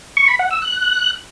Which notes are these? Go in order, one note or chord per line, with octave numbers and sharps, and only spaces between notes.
C#6
B5
F#5
E6
F#6